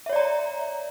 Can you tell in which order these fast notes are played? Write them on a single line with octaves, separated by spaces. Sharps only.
E5 C#5 D5 A#5